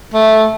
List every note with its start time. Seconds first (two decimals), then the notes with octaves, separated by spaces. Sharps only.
0.14 A3